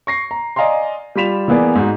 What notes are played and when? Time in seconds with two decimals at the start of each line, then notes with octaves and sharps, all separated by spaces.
0.07 C#6 A#6 C7
0.31 A#5
0.56 D5 D#5 F5 G#5 A#5 C6
1.15 G3 F4 B5 B6 E7 F7
1.48 E3 A#3 B3 G#4 D5
1.75 G#2 D#4 F#4